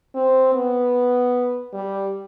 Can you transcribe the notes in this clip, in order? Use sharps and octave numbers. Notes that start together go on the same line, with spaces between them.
C4
B3
G3